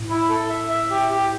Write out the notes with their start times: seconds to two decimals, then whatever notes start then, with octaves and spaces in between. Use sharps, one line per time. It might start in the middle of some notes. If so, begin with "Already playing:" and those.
Already playing: A2
0.10 E4
0.29 A4
0.49 E5
0.70 E5
0.90 G4
1.10 G4